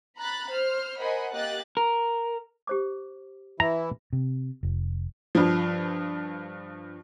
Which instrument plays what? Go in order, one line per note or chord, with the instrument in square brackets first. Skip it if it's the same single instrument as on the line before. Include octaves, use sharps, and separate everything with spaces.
[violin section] A#5 B5 F#6 A6
C5 F6
A#4 C5 D#5 F#5 G#5 B5
A#3 G4 D#5 F#6 A6
[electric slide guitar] A#4
[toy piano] G4 C5 D6
[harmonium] E3 E4 [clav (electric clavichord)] A#5
[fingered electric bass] C3
F1
[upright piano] G2 F3